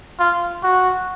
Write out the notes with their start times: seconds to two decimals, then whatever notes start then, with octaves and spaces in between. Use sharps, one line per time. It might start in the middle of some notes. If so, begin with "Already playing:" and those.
0.19 F4
0.63 F#4